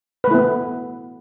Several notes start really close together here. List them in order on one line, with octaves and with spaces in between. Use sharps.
B4 A3 E4 B3